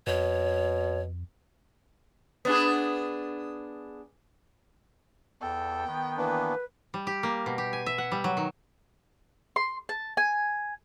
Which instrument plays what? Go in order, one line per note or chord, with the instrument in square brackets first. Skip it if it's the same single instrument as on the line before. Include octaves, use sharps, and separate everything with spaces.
[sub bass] F2 [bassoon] B2 [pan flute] C#5
[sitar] B3 D4 G#4
[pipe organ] E2 A4 [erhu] G5
[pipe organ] D#3 B3
[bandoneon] E3 A#3 D4 [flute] B4
[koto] G3
G4
A#3
B2
G4
G#5
E5
F#5
G3
F#3
D#3
[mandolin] C6
A5
G#5